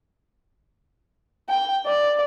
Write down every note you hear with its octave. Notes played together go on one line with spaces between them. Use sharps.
G5
D5